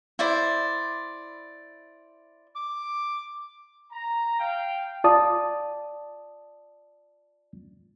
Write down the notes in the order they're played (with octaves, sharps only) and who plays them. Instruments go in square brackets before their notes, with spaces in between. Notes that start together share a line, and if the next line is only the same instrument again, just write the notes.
[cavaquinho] E4 C5 D5
[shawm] D6
[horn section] A#5
F5 G5
[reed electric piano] F4 D5 A5 D#6